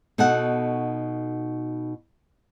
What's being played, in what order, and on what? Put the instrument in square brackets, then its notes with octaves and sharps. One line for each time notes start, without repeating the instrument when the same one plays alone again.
[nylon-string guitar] B2 D#4 F#4 A4 F#5